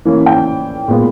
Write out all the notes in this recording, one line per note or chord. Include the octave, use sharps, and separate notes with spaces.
E3 A#3 C#4
G5
A#2 G#3 B3